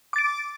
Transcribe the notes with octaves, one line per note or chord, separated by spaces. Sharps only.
D6 A6 D7